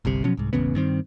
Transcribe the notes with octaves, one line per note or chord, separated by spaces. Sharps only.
G1 C2 C3
B2 F3 F#3 C#4
C2 G#2
E1 A1 C#3 B3
G2 D#3 C4